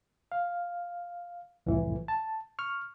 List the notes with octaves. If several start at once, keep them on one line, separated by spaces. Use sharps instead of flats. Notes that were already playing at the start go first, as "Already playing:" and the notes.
F5
C2 F2 A2 E3
A5
C#6 F6